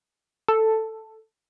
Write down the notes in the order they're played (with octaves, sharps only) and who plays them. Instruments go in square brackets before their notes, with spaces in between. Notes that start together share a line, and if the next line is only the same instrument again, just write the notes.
[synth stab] A4